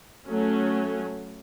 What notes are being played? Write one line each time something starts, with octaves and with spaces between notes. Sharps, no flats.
F#3 A3 C#4